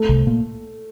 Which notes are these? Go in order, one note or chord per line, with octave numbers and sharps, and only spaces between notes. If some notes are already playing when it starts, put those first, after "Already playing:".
Already playing: A3
C2 C3
A#2 A#3